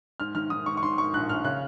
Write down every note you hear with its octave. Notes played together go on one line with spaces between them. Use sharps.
G#2 F6
D#3 F6
D#3 D#6
G#2 C#6
C#6
D#3 C6
G#2 C#6
A#1 F#6
A#1 F6
C#3 F#6